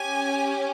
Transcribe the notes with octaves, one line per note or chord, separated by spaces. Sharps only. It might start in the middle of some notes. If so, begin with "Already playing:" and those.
Already playing: C#4 G4 G#5